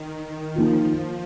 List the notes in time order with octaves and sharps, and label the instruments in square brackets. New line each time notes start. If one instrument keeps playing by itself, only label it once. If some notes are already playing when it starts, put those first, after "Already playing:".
Already playing: [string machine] D#3
[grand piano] D#3 A#3 F4 [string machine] F3